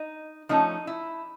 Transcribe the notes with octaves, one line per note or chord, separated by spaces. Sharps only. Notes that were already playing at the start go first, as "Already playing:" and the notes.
Already playing: D#4
F3 A3 C#4 D#4
E4